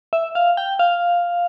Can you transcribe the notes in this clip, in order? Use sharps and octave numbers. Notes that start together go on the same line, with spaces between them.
E5
F5
G5
F5